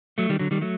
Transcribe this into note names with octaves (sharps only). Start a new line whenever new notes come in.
F#3 A3
D#3 G3
D3 F#3
D#3 G3
F#3 A3